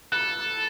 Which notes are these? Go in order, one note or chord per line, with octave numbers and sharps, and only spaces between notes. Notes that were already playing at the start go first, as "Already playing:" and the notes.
A4 F#6